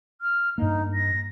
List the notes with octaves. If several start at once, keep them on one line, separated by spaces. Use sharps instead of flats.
F6
G2 A#3 D#4
A#6